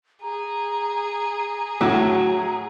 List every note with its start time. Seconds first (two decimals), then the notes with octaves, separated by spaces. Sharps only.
0.23 G#4 A#5
1.81 A2 F#3